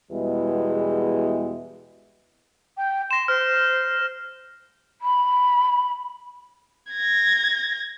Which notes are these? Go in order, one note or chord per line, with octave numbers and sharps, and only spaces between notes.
E2 B2 E3 G3 G#3
G5
C6 A#6 E7
C5 F6
B5
G#6 A#6